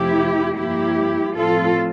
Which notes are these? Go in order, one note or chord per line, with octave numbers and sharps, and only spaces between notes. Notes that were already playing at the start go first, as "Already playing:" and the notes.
Already playing: F2 C3 F3 A3 E4 G4
G2 F3 A#3 E4 G4
A2 F3 C4 F4 A4